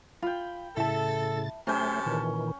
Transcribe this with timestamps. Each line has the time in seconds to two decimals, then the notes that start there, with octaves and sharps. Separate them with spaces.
0.22 F4 G5 B5
0.77 A2 C#3 E4 A4 A5 A6
1.67 C3 F#3 A3 C#4 G#4 C5 G5 A5
2.06 A#2 D#3 E3